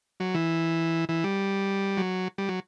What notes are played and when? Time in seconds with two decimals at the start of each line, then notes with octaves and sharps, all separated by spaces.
0.20 F#3
0.34 E3
1.09 E3
1.24 G3
1.97 F#3
2.38 G3
2.49 F#3